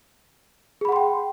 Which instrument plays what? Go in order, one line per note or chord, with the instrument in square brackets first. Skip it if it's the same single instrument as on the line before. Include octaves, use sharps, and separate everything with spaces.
[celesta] G#4
B5
F#5
C6
G5